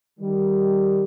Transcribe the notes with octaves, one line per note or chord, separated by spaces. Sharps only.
D#3 G3